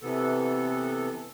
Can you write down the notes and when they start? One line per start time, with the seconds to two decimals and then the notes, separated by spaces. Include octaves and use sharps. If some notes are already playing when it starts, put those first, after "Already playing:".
0.02 C3 E3 B3 A4